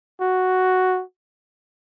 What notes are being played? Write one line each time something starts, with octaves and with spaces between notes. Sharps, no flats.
F#4